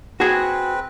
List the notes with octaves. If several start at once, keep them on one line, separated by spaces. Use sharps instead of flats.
C4 F#4 G#4 B4